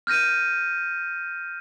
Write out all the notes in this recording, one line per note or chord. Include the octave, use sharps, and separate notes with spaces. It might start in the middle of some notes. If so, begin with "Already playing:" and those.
F6 G6 A#6 D#7